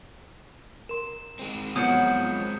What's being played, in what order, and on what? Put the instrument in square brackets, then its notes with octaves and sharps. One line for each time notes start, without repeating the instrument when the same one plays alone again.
[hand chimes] A#4 C6 [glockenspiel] E7
[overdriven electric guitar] G#3 C4
[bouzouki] F3 F#3 B4 [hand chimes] B3 [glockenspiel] D#6 G6 C#7